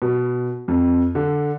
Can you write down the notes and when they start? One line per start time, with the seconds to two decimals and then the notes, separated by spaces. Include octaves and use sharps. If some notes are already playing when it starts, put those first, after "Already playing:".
0.02 B2
0.68 F2
1.15 D3